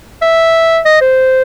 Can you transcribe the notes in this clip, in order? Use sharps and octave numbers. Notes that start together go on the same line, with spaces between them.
E5
D#5
C5